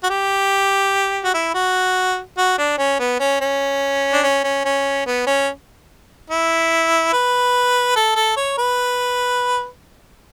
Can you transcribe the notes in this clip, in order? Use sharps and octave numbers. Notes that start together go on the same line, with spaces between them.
F#4
G4
F#4
E4
F#4
F#4
D4
C#4
B3
C#4
C#4
D4
C#4
C#4
C#4
B3
C#4
E4
B4
A4
A4
C#5
B4